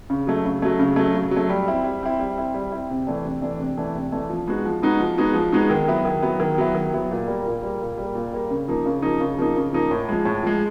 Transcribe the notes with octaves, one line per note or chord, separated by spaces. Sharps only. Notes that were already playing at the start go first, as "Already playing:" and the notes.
C#3
F#3 A3
C#3
F#3 A3
C#3
F#3 A3
C#3
F#3
A3
G3
C4 E4
G3
C4 E4
G3
C4 E4
G3
C4 E4
C3
E3 A3 D4
C3
E3 A3 D4
C3
E3 A3 D4
C3
E3 A3 D4
F3
G#3 B3 D#4 F#4
F3
G#3 B3 D#4 F#4
F3
G#3 B3 D#4 F#4
F3
G#3 B3 D#4 F#4
D#3
F#3 B3 E4
D#3
F#3 B3 E4
D#3
F#3 B3 E4
D#3
F#3 B3 E4
A#2
G3 A#3
A#2
G3 A#3
A#2
G3 A#3
A#2
G3 A#3
C#3
F3 A#3 D#4
C#3
F3 A#3 D#4
C#3
F3 A#3 D#4
C#3
F3 A#3 D#4
A2
F3 G#3
A2
F3 G#3